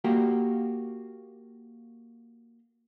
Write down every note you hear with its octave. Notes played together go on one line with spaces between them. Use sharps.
A#3 F#4 G4